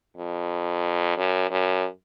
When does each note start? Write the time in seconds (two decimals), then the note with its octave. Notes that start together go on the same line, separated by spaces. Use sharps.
0.17 F2
1.17 F#2
1.51 F#2